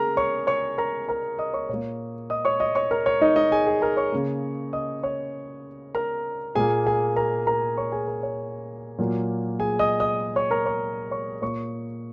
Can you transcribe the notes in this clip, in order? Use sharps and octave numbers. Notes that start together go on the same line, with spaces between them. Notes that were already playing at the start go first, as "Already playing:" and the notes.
Already playing: C#3 A#3 G#4 A#4 A#5
C#5 C#6
C#5 C#6
A#4 A#5
A#4 A#5
D#5 D#6
C#5 C#6
A#2 A#3 C#5
D#5 D#6
C#5 C#6
D#5 D#6
C#5 C#6
A#4 A#5
C#5
D#4 D#5
D#4 D#5
G#4 G#5
G#4 G#5
A#4 A#5
C#5 C#6
C#3 A#3
D#5 D#6
C#5 C#6
A#4 A#5
A#2 A#3 G#4 G#5
G#4 G#5
A#4 A#5
A#4 A#5
C#5 C#6
G#4 G#5
A#4
C#5
A#2 F#3 A#3
G#4 G#5
D#5 D#6
D#5 D#6
C#5 C#6
A#4 A#5
C#5 C#6
C#5 C#6
A#2 A#3 C#5 C#6